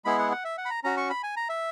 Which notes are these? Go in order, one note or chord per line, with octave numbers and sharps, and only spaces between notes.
G#3 B3 E4 G#4 B5
F#5
F#5
E5
F#5
B5
A#5
C#4 F#4 A#5
C#6
B5
G#5
A#5
E5